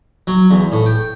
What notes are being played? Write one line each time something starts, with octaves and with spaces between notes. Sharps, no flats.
F#3
E2
A2
G5